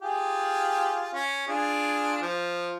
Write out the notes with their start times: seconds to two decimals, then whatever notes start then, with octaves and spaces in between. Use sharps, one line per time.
0.02 F4 G4 G#4
1.14 C#4
1.48 D4 F4 G#4
2.22 F3